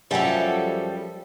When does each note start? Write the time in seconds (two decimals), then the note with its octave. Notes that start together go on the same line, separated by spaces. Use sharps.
0.11 F#2 F3 G3 A4 C#5 D#5 E5